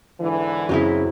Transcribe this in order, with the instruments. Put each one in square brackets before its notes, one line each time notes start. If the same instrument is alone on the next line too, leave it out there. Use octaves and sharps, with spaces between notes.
[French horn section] G#2 D3 E3
[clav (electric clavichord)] F#2 C#3 [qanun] F#3 C4 E4